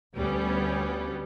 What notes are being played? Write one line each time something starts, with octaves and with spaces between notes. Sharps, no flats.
D2 G3 B3 C#4